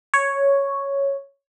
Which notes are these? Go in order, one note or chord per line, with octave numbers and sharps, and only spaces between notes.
C#5